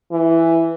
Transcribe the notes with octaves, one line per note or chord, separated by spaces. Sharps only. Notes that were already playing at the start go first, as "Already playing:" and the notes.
E3